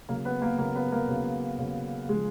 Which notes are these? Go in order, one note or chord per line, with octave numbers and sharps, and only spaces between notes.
C#3 F#3 A#3 A#4
B3 B4
A#3 A#4
C#3 F#3 A#3 A#4
B3 B4
A#3 A#4
C#3 F#3
C#3 F#3
C#3 F3 G#3 G#4